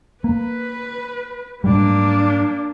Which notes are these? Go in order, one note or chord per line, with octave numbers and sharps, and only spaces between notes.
A#3 B4
G#2 F#3 G3 A#3 D4